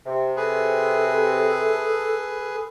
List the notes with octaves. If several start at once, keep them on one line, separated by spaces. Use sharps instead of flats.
C3 G4
G#4 A4 B4